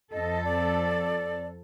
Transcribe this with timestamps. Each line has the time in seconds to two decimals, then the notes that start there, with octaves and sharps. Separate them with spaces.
0.12 F2 A4 D#5
0.44 D5